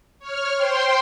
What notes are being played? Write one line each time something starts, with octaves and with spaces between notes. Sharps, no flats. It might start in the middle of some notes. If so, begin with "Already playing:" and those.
C#5 F6
C5 G5 C6